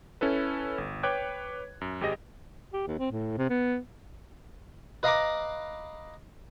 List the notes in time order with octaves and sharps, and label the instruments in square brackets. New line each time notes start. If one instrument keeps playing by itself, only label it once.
[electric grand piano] C#4 E4 A4 B4
G1
B4 C#5 G5 D6 F#6 G#6
F#2
G#1 G4 G#4 D#5 A#6
[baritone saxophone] G4
D#2
C4
A2
C3
B3
[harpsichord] B4 D#5 F5 A#5 B5 D6